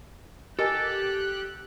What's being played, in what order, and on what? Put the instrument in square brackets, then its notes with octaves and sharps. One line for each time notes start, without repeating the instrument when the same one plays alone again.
[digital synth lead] G4 [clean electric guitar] A4 [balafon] A#4 D#5 G#5 [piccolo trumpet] F#6